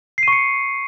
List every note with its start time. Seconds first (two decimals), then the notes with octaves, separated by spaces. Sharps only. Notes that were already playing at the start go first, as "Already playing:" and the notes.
0.18 C7
0.23 D#7
0.28 C#6
0.32 C#7